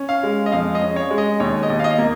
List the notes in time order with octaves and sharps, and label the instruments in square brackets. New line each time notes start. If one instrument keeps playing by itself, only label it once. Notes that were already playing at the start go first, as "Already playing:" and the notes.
Already playing: [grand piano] C#4
F5
G#3
D#5
F2 F5
D#5
C#4
C#5
G#3
D#5
D#2 C#5
D#5
D#2
F5
D#5
A#3